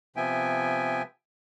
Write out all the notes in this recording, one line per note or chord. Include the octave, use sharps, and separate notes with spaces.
C3 F3 B3 E5 G5 G#5